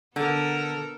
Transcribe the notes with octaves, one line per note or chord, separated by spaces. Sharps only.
D3 B3 A4 A#4